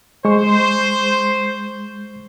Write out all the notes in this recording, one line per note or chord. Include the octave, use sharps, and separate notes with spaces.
G#3 C5 C#6